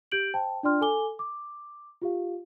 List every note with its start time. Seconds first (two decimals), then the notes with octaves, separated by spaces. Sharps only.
0.12 G4 G6 D7 F#7
0.34 C5 G5 A5
0.63 D4 F4 D5 G5 C6 F6
0.81 A4 G#5 D6 G7
1.19 D6
2.02 F4 G4 F5